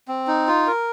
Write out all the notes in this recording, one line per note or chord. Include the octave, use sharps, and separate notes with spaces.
C4
D#4
F4
A#4